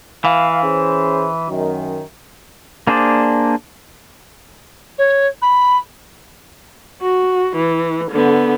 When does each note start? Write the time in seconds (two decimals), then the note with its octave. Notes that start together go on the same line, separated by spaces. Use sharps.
0.25 E3 F5
0.63 C#4 G#4 C5
1.49 F#2 D#3
2.87 A#3 D4 G#4 C5 D5
4.98 C#5
5.42 B5
7.02 F#4
7.57 E3
8.12 D3 B3